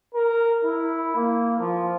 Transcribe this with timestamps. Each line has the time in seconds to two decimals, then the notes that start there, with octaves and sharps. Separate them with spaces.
0.14 A#4
0.64 E4
1.15 A#3
1.60 F3